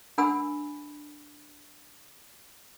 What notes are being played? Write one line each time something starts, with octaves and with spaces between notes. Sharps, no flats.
D4 A#4 F#5 G#5 B5 E6